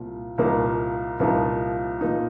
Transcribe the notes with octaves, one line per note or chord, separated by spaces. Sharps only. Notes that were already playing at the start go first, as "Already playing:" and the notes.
Already playing: C2 A#2 F3
C2 A#2 F3 A#3 D#4
C2 A#2 F3 A#3 D#4
A#2 F3 A#3 D#4